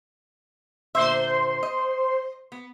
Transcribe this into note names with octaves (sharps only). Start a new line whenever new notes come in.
A#2 D3 C5 E5 C6
D#5
B3